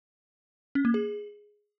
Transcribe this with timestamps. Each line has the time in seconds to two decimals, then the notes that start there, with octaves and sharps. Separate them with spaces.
0.75 C#4
0.85 A#3
0.94 G#4